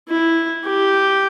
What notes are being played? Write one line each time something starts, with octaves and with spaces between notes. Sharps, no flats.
E4
G4